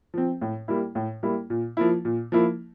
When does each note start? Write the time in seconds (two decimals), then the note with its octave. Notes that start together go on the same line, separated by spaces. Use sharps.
0.14 F3 C4
0.41 A2
0.68 G3 A#3 E4
0.95 A2
1.23 G3 A#3 E4
1.50 A#2
1.77 F3 A#3 E4
2.05 A#2
2.32 F3 A#3 E4